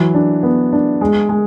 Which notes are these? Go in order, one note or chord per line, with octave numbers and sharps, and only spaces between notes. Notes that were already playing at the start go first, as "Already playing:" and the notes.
Already playing: E3 F#3
D4
B3
D4
G#3
G#3